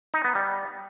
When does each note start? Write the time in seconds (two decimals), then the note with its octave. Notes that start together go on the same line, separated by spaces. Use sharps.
0.14 D#4
0.24 B3
0.35 G3